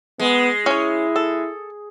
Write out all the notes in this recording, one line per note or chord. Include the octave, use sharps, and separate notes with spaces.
G#3 B3
C#4 E4 C#5
A4